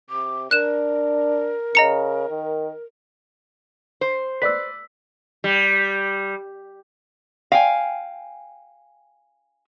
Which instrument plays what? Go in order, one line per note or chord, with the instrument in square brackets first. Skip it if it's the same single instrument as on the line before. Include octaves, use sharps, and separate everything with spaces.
[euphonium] C3 [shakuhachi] D6
[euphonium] D4 [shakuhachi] A#4 [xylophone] F#6 E7
[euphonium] C#3 [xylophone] D#5 A#5 C#7
[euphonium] D#3
[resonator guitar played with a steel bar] C5
[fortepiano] B4 D5 [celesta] E6 B6
[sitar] G3
[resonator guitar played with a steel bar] F5 G5 G#5